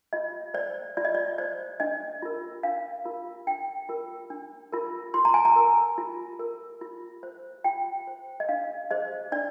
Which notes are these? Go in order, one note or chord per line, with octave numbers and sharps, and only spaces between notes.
F4 D#5
C5 D5
F4 D5
D#5
D5
C5 D5
D4 D#5
F4 A#4
D4 F5
F4 A#4
D4 G5
F4 A#4
D4
F4 A#4
F4 C6
A#5
G#5
A#5
A#4
F4
A#4
F4
C5
F4 G5
C5
D#5
D4 F5
G#4 C5 D#5
D4 D5